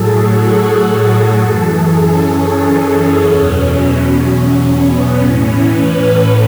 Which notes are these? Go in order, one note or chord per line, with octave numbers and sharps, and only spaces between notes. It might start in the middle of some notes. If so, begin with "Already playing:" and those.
Already playing: A2 F#3 G#4 A4
F#4
F#4
A4
F#2 E3 A4
G#4
C#4
C#4
E2 B2 F#3
C#4
B3
A2 E3 C#4
B4
A4